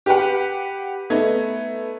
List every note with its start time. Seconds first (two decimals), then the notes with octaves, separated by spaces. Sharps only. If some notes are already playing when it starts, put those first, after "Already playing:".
0.06 G4 B4 F#5
1.10 A3 B3 D#4 G#6